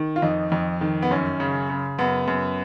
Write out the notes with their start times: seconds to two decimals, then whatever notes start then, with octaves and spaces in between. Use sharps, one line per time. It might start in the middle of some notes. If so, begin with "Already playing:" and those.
Already playing: D#3
0.16 F4
0.22 F2 D#4
0.52 F2
0.81 D#3
1.02 B3
1.11 F#2 C#4
1.40 C#3
1.70 C#3
1.99 F#2 B3
2.28 F#2